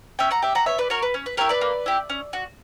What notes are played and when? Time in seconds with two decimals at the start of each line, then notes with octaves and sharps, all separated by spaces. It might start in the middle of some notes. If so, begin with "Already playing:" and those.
0.19 C#4 E5 G5
0.31 F#5 A#5
0.42 G4 E5 G5
0.55 F#5 A#5
0.66 B3 C#5 E5
0.78 B4 D5
0.90 F#4 A#4 C#5
1.02 B4
1.14 C#4
1.26 B4
1.37 E4 G4 A#4 C#5
1.49 B4 D5
1.61 A#3
1.86 E4 G4
2.10 C#4
2.33 F#4